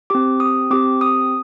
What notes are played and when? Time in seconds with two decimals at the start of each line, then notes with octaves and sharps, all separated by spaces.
0.10 C4 G4 D6
0.40 D#6
0.71 C4 G4 D6
1.01 D#6